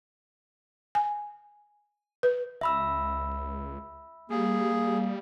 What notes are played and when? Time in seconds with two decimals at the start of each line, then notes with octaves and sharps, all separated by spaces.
0.95 G#5
2.23 B4
2.61 C#2 E5 B5 E6
4.30 G3 A#3 G#4